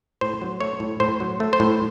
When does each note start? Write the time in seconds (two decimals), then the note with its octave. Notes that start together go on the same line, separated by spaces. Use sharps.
0.21 A2 C5
0.41 F#3
0.60 A3 C#5
0.80 A2
1.00 A2 C5
1.20 F#3
1.40 A3
1.53 C5
1.60 A2